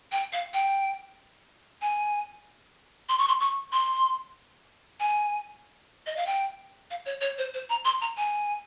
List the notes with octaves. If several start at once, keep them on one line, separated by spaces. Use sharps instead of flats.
G5
F5
G5
G#5
C6
C#6
C6
C#6
C6
G#5
D#5
F5
G5
F5
C#5
C#5
C5
C5
A#5
C6
A#5
G#5